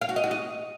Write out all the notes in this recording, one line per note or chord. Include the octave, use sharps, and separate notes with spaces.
F5
F#4
D#5
F#4
D#5